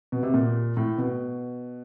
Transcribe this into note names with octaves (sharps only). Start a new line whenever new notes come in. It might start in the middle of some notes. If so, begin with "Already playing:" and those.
B2
C3
A#2
A2
B2